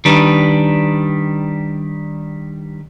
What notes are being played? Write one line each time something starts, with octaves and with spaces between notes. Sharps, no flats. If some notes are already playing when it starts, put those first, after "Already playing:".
D#3 G3 D4 B4